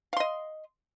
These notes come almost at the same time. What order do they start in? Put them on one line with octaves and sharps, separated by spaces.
F5 C6 D#5